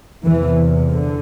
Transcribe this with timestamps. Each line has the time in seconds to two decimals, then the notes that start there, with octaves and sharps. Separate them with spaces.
0.24 E2 C3 E3
0.91 D3